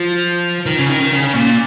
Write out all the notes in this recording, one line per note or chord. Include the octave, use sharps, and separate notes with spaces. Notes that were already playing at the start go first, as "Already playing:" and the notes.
Already playing: F3
D#3
C#3
D#3
D#3
C#3
A#2